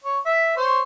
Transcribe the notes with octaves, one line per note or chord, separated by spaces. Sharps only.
C#5
E5
C5 C#5